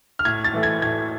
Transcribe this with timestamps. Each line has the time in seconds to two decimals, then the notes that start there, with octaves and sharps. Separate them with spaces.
0.19 F6
0.25 A2 G#6
0.44 A6
0.54 E3 A3
0.63 G#6
0.82 A2 G#6